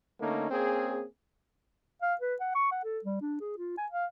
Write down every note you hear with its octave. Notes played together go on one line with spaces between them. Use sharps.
D3 A3 A#3 C#4 D#4
A#3 C4 C#4 G#4
F5
B4
F#5
C#6
F#5
A4
G3
D4
G#4
F4
G#5
F5